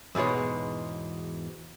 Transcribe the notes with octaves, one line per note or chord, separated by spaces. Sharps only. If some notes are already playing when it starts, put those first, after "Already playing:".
E2 G#2 B2 G#3 C#5